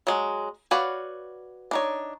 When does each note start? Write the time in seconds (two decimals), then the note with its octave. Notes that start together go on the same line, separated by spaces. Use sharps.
0.07 F#3 G#3
0.71 F#4 B4 C#5 D5 F5
1.71 D4 D#4 C#5